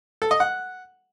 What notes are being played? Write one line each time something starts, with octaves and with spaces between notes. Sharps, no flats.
A4
D#5
F#5